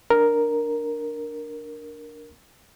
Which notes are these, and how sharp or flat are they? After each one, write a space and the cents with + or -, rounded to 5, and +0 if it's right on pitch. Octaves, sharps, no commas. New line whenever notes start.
D4 +0 A#4 +0